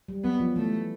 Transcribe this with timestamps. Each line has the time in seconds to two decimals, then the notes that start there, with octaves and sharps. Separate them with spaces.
0.08 G3
0.24 F#3 B3
0.40 F3
0.56 E3 A3